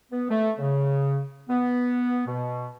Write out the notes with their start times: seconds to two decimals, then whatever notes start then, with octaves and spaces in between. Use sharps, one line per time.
0.12 B3
0.30 A3
0.59 C#3
1.49 B3
2.27 B2